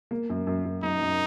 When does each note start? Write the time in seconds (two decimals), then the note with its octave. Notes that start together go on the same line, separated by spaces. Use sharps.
0.11 A#3
0.30 F#2
0.47 F#2
0.65 F#2
0.83 F#2 D#4
1.01 F#2